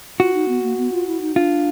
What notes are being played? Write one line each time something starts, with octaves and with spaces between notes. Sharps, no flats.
F4 F#4
D#4
B3
A#3
B3
F4
E4
D#4
D4 F4